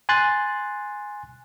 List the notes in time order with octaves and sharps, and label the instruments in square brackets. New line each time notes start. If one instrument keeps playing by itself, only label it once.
[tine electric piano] G#5 C6 F#6 A6